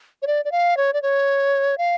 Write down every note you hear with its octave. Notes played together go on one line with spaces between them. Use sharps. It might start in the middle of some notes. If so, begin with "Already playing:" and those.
C#5
D5
D5
F5
C#5
D5
C#5
F5